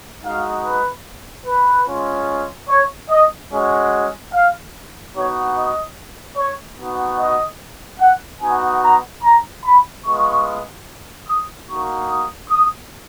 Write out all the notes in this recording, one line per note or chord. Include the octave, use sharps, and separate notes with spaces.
G#3 D#4 F#4 F5
B4
B4
G#3 C#4 F4
C#5
D#5
G#3 C#4 F#4
F5
B3 D#4 F#4 C#5
D#5
C#5
B3 D#4 F#4
D#5
F#5
B3 D#4 F#4 G#5
A#5
A#5
B5
G#3 B3 F4 C#6
D#6
A#3 D#4 F#4 C#6
D#6
D#6